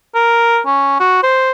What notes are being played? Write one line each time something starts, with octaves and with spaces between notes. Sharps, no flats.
A#4
C#4
F#4
C5